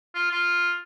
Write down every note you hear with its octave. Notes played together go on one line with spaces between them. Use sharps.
F4
F4